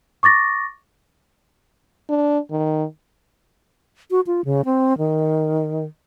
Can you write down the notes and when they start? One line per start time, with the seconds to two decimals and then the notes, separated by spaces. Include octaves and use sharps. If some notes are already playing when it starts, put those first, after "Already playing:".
0.23 C#6 D6 A6 A#6
2.10 D4
2.51 D#3
4.11 F#4
4.27 F4
4.45 C#3
4.65 C4
4.98 D#3